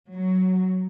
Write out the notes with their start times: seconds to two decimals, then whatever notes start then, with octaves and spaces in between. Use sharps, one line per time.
0.14 F#3